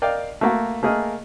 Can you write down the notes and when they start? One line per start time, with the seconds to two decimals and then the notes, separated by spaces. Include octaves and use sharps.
0.02 A#4 D5 D#5 F5 G5
0.41 A3 A#3 F#4
0.83 A3 A#3 G#4 A#4 D#5